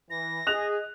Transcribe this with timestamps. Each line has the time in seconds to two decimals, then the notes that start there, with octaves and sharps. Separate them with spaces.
0.10 E3 A#6
0.47 G#4 D#5 F#6 F7